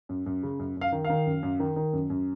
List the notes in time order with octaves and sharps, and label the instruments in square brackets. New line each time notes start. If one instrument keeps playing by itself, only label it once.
[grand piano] F#2
F#2
C#3
F#2
F#2 F5
D#3
D#3 F5
F#2
F#2
D#3
D#3
F#2
F#2